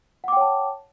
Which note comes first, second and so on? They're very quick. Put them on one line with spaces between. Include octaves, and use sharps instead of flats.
F#5 D6 G5 C#5 A5